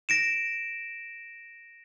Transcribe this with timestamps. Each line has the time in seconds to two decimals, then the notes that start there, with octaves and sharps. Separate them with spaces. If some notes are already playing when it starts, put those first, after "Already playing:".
0.09 A#6 D7 E7